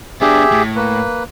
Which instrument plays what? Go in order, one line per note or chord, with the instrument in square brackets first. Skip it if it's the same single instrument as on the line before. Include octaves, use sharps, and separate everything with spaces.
[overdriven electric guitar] B3 D4 [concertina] G4 G#4 E5
[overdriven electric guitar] A2
[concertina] A#3 B4